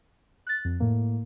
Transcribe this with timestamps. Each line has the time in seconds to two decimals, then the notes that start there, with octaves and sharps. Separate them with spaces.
0.47 F#6 A6
0.65 F2
0.80 A2 A#3